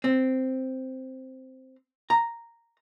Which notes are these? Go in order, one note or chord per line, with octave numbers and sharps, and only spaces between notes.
C4
A#5